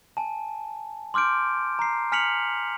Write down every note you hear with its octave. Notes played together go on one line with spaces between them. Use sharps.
G#5 A5
C6 D6 F6 G6 D7
A#5 C7
G#5 F6 B6 C#7 F7 F#7